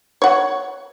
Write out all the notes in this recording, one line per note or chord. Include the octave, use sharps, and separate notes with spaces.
C#5 F#5